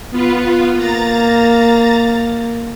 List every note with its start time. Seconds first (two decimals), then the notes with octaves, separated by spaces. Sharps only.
0.11 B3 F4 B4
0.76 A#3 A#5 A6